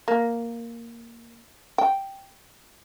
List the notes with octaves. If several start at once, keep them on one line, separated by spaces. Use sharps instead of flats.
A#3
G5